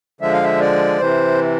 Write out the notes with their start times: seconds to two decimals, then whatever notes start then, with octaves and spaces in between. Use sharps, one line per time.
0.21 D3 F3 G#3 E5
0.33 F5
0.44 E5
0.60 D5
0.98 C3 E3 C5